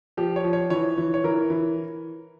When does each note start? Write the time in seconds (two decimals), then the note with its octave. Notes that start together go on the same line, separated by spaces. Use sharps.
0.17 F3 G4
0.36 C#5
0.44 F3
0.53 C#5
0.70 E3 C#5
0.98 E3
1.14 C#5
1.24 E3 A#4
1.50 E3